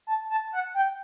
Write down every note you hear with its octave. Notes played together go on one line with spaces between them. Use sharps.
A5
A5
F#5
G5